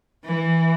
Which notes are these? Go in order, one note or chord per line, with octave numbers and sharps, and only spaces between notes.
E3